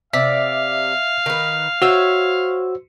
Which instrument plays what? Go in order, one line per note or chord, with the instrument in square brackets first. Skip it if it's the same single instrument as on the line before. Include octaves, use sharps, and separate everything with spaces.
[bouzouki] C3 D5 [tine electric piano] E5 B6 [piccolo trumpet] F5
[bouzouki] D#3 B4
[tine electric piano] F#4 E6 [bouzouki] C5 C#5 E5